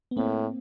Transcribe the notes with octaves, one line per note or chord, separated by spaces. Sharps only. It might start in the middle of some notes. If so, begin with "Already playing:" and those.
B3
A2 A#3 C4